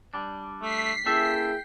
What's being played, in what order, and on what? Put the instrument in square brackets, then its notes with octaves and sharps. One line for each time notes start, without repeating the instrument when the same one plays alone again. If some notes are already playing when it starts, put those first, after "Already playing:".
[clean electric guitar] G3 D4
[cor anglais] A3 [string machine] B6 C7
[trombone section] A#3 E4 G#4 [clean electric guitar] C#4 A4 E5 [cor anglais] G5